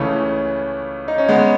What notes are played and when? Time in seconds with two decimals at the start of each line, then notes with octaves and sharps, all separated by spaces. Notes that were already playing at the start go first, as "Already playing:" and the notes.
Already playing: C#2 C#3 E3 A3 C#4
1.08 D#4
1.18 C#4
1.29 G#3 B3